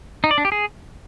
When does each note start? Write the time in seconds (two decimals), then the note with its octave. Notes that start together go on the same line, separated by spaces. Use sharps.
0.24 D#4
0.31 D5
0.38 D4
0.45 G4
0.52 G#4